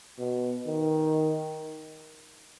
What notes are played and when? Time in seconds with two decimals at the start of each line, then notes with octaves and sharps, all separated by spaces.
0.19 B2
0.66 D#3